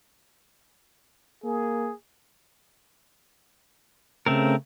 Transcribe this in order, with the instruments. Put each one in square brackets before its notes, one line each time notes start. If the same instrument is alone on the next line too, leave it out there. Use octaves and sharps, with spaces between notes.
[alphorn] A#3 [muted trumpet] G#4
[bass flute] C#3 [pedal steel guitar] A3 C4 A#4